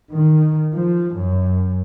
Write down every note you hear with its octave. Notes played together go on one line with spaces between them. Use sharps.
D#3
F3
F#2